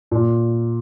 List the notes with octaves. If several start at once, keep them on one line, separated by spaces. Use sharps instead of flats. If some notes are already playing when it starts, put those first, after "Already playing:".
A#2